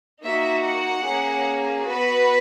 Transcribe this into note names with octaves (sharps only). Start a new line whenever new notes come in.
A#3 D#4 F#4 E5
F#5
A#3 C#4 G#4
B3 F#4 B4